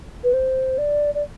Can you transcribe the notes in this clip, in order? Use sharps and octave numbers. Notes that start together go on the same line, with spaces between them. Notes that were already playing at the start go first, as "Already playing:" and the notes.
B4
C5
D5
D5